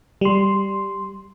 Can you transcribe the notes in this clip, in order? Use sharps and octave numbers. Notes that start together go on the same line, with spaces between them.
G3 C6